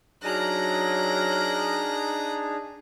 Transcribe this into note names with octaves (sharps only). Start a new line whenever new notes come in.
F#3 D4 D#4 G#4 A#4 A#5 F#6